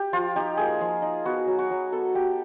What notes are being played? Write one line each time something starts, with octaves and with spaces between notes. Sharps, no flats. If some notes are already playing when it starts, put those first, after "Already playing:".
Already playing: G4
F3 F4
D#4 G4
A#3 G#4
F3
D#4
B3 F#4
F#3
F#4
F#3
B3 A4
B3 G4